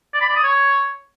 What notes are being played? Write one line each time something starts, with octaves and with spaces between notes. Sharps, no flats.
D5
B5
D5
D#6
C#5